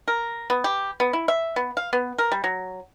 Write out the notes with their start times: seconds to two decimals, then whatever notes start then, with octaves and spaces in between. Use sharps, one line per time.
0.08 A#4
0.50 B3
0.64 G4
1.00 B3
1.13 E4
1.28 E5
1.56 B3
1.77 F5
1.93 B3
2.18 A#4
2.32 G3
2.44 F#3